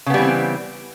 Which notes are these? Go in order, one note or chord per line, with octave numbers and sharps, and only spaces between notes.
C#3 E3 G3 B3 C4